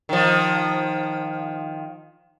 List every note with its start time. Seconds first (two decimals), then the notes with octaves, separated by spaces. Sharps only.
0.09 D#3 F3